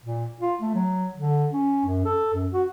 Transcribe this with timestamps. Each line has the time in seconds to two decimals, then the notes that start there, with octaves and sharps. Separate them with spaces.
0.06 A#2
0.41 F4
0.61 A3
0.75 F#3
1.14 D3
1.53 C#4
1.86 F#2
2.05 A4
2.34 F#2
2.53 F#4